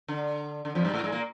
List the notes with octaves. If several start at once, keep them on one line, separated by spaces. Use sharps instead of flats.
D3
D3
F2 F3
G2 G3
A2 A3
G#2 G#3
A#2 A#3